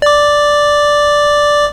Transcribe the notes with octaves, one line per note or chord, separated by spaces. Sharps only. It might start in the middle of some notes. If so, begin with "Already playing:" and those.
D5 D6